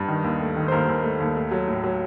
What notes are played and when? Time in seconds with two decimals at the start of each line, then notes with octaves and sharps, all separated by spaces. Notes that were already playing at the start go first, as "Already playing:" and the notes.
Already playing: G2
0.08 D#3
0.24 D#2
0.41 A3
0.56 D#3
0.68 C5
0.72 D#2 A#4
0.88 D#2
1.03 A3
1.20 D#2
1.36 A3
1.51 F#3
1.68 A2
1.84 F#3